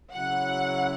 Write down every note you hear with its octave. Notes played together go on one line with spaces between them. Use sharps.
C#3 F#3 E4 F#5